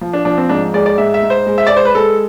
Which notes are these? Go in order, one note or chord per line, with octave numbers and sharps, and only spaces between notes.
F3
D4
F3 D4
C4
G#2 D4
G#3 D5
D5
G#2 E5
E5
G#2
C5
G#3
E5
G#3 D5
C5
B4
G#3 A4